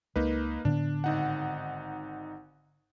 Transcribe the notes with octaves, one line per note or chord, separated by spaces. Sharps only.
C#2 A#3 D#4 B4
A2 D3 B3 D4
G#1 D#4 F#5